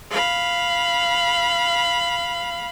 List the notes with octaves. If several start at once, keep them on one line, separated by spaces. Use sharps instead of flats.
F5 B5